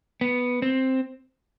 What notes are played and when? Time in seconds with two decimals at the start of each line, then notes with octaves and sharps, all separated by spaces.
0.21 B3
0.62 C4